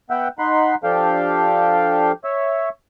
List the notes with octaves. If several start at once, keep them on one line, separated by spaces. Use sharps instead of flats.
B3 E5 F#5 G5
D#4 F#5 B5 C6
F3 D4 G4 A4 F5 G5
C#5 E5